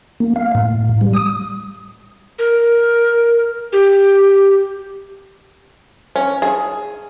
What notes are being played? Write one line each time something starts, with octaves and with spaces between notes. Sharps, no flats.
A#3
F5
A2
G3
D#6
A#4
G4
C#4
G#4